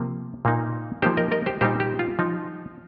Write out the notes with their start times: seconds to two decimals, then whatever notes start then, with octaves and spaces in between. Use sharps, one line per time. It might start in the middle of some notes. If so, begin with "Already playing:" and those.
Already playing: C3 F3 A#3 F4
0.45 A#2 A#3 D#4
1.02 F3 A#3 D#4 G4 C5
1.17 A#4 D#5
1.32 A#4 D#5
1.46 G4 C5
1.61 A#2 G3 D#4 G4 C5
1.80 G4
1.99 F4
2.19 F3 D#4